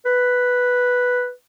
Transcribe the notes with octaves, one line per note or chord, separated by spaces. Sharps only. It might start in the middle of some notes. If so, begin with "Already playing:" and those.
B4